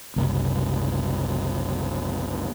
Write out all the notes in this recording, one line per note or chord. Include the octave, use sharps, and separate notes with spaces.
F#1 C2